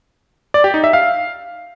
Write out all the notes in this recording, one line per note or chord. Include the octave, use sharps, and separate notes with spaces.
D5
G4
D#4
E5
F5